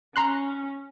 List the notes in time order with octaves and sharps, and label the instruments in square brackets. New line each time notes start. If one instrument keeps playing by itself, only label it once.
[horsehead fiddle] C#4 [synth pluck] A#5 C6 F#6